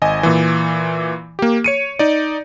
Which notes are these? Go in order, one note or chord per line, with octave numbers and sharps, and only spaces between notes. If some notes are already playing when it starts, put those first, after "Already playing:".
G#1 D#5 G#5
A#2 E3
A#3 G4
C#5 C#7 D#7
D#4 D5